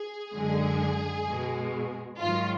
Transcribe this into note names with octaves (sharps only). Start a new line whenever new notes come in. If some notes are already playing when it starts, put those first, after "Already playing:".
Already playing: G#4
F#2 D3 G#3
B2 G#3
G#2 D#3 F#3 F4